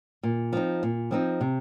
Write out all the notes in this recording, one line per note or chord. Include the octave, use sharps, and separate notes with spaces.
A#2
F3 C4 D#4
A#2
F3 C4 D#4
C3